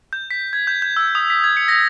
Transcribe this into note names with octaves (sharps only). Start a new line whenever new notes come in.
G6
B6
G#6
G6
G6
E6
D#6
B6
G#6
C#7
A#6